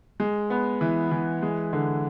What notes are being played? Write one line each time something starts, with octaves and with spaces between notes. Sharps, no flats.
G#3
B3
E3
E3
G#3
D3